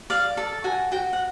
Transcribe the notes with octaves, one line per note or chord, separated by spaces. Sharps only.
D5 F5
A4 A5
F#4 G#5
F#4 G5
F#5